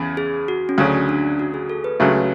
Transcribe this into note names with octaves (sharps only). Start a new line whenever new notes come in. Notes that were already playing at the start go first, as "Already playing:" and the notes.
Already playing: E2 C#3
G#4
F#4
C#4
D2 C#3 F#3 D4
D4
F#4
G#4
A4
B4
C#2 C#3 F#3 A3